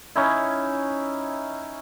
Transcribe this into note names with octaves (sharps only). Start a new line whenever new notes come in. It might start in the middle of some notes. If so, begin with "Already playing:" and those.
C#4 D#4 E4